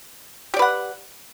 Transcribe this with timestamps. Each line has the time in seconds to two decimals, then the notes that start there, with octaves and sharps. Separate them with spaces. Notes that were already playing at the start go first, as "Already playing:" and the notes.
0.54 G4
0.56 D5
0.59 B4
0.62 F#5